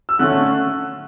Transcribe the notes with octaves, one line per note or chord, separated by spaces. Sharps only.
E6
D3 A3 C#4 F#6